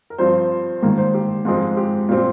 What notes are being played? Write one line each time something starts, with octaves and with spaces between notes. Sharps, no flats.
A#4
G2 F3 C4 C5
G#2 D#3 A#3 A#4
C5
G4
G#2 F3 G#3 C4 F4
G4
A#2 G3 C4